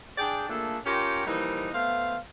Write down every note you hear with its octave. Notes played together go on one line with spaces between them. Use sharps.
D4 G#4 D5 G5
A3 A#3 D4 F4 G#4 A4
C#4 F4 G4 A#4 G5 A#5
E3 F3 G3 A#3 D#4
A3 B3 C5 F5